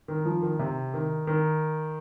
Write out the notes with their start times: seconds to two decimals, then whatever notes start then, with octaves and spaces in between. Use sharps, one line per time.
0.08 D#3
0.25 F3
0.42 D#3
0.59 C3
0.94 D#3
1.27 D#3